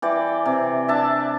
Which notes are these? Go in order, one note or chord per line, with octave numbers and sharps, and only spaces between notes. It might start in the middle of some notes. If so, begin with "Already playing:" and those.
E3 D5 G5
C3
D4 E5 A5